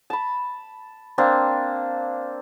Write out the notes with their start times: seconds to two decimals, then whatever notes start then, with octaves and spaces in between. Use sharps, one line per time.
0.10 A5 B5
1.18 A#3 C4 D4